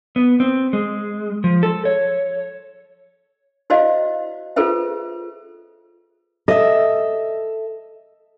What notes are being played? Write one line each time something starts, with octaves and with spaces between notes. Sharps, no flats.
B3
C4
G#3
F3
A4
C#5
E4 F#4 C5 D5 D#5 F5
F4 G#4 A4 B4 C5 E5
A4 D#5 E5